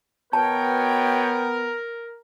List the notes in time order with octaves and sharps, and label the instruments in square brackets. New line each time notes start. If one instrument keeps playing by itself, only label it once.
[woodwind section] B2 C#5 G5 [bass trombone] B3 [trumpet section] A#4 [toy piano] A5